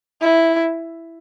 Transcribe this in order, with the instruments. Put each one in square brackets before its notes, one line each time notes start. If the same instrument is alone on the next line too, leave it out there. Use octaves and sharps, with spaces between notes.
[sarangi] E4